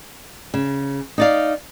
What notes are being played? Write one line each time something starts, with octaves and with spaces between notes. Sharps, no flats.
C#3
D#4 D5 F5